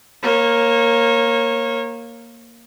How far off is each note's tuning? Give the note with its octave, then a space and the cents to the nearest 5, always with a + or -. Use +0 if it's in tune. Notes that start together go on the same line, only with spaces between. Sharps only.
A#3 +0 C#5 -25